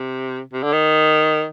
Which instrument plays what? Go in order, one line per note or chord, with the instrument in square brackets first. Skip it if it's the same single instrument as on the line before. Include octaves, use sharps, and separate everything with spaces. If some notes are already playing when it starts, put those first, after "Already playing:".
Already playing: [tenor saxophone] C3
C3
D3
D#3